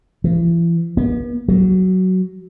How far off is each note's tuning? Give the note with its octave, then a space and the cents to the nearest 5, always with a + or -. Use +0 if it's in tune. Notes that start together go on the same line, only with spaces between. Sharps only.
E3 +40
B3 -40
F#3 +10